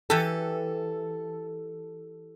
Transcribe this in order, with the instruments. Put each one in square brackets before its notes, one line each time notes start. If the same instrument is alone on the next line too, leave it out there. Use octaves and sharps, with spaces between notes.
[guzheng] E3 G4 [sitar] A4